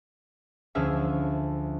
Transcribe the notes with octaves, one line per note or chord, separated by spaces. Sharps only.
D2 F3 C#4 G#4 E5 F6